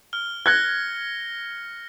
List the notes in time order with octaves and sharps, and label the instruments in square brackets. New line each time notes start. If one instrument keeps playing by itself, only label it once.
[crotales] F6 G7
[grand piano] F#6 G#6 [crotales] A#6 C#7 G7